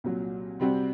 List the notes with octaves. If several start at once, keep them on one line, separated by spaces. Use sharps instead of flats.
C2 A#2 F#3
C3 G3 C4 F#4